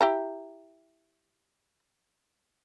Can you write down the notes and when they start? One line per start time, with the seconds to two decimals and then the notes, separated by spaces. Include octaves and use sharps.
0.01 E4 G4 A#5